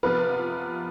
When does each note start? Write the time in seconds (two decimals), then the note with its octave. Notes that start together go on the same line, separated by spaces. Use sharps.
0.03 C3 F3 B3 F4 B4